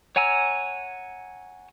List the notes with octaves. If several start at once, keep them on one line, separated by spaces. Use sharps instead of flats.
C#5 F#5 G#5 A#5 E6